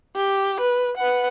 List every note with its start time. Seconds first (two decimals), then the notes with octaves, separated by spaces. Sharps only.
0.16 G4
0.60 B4
0.97 B4 F#5